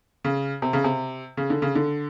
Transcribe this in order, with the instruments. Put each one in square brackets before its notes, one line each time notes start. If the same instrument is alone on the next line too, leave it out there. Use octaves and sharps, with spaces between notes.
[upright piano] C#3
C3
C#3
C3
C#3
D3
C#3
D3